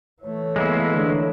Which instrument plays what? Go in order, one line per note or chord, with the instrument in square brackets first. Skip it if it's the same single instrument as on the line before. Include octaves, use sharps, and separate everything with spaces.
[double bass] E3 A3 [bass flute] C#5
[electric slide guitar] G#3 A#3 E4 [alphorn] B3
[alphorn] D3 [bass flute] C#5